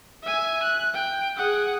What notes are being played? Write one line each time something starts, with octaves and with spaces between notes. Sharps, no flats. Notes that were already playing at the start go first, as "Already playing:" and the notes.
E5 G#5
F#6
G5
G#4 F#5